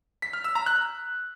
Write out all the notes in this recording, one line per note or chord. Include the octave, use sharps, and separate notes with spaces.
B6
F6
E6
A#5
F#6